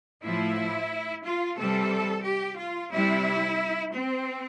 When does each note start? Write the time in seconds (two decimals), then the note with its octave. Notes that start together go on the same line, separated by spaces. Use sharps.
0.23 A2 F3 E4
1.24 F4
1.58 C3 E3 G3 A4
2.25 G4
2.59 F4
2.92 C3 G3 E4
3.93 C4